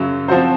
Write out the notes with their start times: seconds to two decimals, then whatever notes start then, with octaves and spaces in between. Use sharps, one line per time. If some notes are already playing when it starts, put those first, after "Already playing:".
Already playing: F#2 C#3 F#3
0.28 F3 C4 F#4 C5